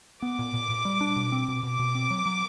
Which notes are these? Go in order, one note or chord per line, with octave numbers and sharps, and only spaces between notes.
B3 D6
A#2
A#2
A#2
G3
D4
B2
C4
B2
B2 D6
B2
C4
F#3
F#3